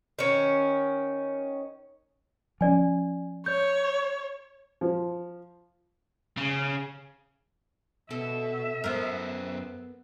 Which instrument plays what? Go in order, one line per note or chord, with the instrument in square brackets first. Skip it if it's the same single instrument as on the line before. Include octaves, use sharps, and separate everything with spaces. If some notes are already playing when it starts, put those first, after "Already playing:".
[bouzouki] D#3 C#4
[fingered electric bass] F3 C#4 [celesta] D5 G#5
[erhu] C#5 [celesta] G6
[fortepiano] F3
[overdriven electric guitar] C#3
[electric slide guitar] B2 [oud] A4 [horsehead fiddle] E5
[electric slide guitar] F#2 C5 [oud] B3 A#4